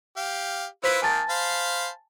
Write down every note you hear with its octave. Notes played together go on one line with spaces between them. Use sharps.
G4 F5
E4 F4 B4 C5 B6
D#3 A#3 G#5 A5 A6
C5 F5 B5